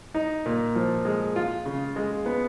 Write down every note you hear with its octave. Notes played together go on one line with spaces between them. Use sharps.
D#4
A#2
F3
G#3
F4
C#3
G#3
B3